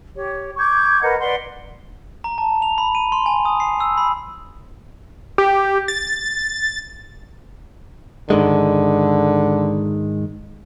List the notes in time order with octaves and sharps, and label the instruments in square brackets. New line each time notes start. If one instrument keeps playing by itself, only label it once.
[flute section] G4 C#5
C#6 D6 G6 G#6
A#4 B4 D#5 F#5
B4 D5 F#5 C6
[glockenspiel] A#5
A5
F7
B5
D#7
C6
G#5
D#6
C7
E6
B5
[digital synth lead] G4
A6
[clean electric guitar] G#2 D#3 G#3 [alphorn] D3